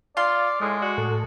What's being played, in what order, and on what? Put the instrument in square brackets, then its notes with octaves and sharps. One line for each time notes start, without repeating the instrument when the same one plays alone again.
[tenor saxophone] F4 [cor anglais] D5 [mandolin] C6
[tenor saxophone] A2 [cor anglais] G#3
[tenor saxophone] F#4 [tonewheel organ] D5
[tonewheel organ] A2 A4